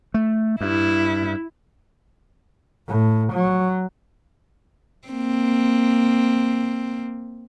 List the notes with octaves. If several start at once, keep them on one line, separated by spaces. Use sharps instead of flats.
A3
G2 E4
A2
F#3
A#3 C4